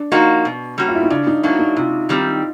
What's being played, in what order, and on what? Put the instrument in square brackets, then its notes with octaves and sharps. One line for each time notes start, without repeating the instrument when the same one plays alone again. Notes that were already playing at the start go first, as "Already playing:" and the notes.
Already playing: [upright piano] D4
[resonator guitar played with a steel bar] F3 A#3 D#4 F#4
B2
G3 A#3 C#4 F#4
[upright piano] F4
E4
D#4
[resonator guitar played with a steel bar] C#3 [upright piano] D4
[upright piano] D#4
[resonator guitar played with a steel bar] F#3 A#3 D4 F#4 [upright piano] E4
[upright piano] D#4
[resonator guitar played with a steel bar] C3 [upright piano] F4
[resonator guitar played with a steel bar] D#3 G3 C4